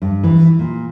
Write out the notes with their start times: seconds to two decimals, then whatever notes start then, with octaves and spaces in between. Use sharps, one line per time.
0.02 G2
0.23 E3
0.59 A#2